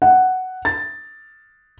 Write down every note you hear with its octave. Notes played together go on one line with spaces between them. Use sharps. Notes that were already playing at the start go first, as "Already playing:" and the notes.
F#5
A6